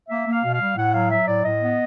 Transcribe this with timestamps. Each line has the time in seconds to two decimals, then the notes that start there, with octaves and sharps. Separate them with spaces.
0.09 A#3 E5
0.26 A#3
0.32 F5
0.43 B2
0.54 F5
0.60 G3
0.77 A2 F#5
0.94 F#3 F5
1.11 F#3 E5
1.27 A2 D5
1.44 A2 D#5
1.61 B3